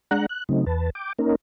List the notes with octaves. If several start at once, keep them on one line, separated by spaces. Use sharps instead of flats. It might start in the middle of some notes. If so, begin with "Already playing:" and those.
G#3 D4 F#5 A#5 F#6
F#6
C#3 F#3 A3 C4 D#4
E2 B4 A5
G5 D6
A#3 C#4 D#4 A#4